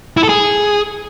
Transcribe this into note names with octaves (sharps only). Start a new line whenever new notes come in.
E4
A4
G#4